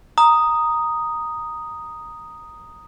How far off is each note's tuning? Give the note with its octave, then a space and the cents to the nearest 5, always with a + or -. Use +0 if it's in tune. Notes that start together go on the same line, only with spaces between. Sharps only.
A#5 +0 D#6 +0